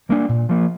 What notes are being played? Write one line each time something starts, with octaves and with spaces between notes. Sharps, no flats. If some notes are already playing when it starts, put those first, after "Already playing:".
G3 A#3 D4
A#2
F3 A#3